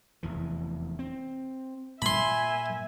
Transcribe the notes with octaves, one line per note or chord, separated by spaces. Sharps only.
F1 E2 E3
C4
A#2 E5 G#5 B5 C6